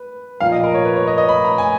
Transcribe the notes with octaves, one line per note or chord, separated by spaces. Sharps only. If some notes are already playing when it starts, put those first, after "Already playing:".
Already playing: B4
A#2 F3 A#3 F5
D#5
A#4
C#5
B4
C#5
D#5
D#5
B5
A#5
G#5